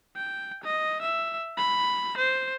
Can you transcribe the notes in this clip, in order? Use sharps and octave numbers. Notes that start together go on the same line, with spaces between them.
G5
D#5
E5
B5
C5